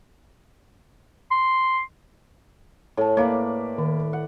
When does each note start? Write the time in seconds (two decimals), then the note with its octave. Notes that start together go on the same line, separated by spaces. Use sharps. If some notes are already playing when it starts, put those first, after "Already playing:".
1.31 C6
2.97 A2 C#5 A5
3.17 A#3 B4 C#5 D5 F5
3.78 D#3
4.13 F#5